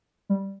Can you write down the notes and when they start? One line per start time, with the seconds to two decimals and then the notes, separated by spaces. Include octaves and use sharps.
0.29 G3